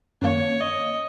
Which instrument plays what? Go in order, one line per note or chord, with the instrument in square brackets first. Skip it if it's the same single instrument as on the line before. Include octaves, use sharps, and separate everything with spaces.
[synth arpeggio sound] F#2 D#3 A#3 [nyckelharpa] C#5
[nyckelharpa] D#5